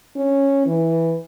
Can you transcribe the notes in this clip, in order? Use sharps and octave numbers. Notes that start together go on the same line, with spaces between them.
C#4
E3